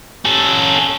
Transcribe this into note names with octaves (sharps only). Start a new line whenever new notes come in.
C#4 A4